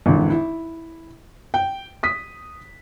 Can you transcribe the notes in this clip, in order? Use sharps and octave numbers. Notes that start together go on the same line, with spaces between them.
G#1 E2 D3
E4
G5
D#6 B6